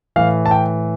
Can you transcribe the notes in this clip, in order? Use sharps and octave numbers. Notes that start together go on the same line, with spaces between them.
A2 E3 F5
A5
G5